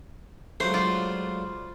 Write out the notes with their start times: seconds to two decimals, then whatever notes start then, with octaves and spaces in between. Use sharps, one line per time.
0.60 C#2 F#3 A3 C5
0.74 F4 D5